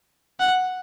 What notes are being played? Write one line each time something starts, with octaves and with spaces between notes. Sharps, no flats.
F#5